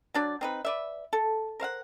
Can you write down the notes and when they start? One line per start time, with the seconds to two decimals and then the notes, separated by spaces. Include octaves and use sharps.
0.14 F#3 D4 D5
0.41 C4 D#4 B4
0.65 B4 D5 E5
1.13 A4
1.60 A#4 C5 F5 F#5